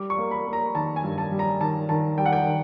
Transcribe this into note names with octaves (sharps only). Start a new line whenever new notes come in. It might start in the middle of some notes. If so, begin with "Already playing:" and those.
Already playing: G3 D6
C#6
A#3
B5
A#3
A#5
D#3 A5
G#5
G2
A5
G3
A#5
D#3 A5
D#3 A5
G3 G5
F#5
G5
D#3